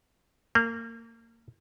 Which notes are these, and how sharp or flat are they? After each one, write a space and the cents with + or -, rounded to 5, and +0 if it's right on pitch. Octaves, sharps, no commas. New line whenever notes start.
A#3 -25